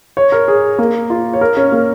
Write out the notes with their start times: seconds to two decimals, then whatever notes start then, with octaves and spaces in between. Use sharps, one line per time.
0.17 C#5
0.32 A#4
0.48 G#4
0.79 A#3
1.10 F4
1.34 C#5
1.41 A#4
1.57 C#4
1.72 A#3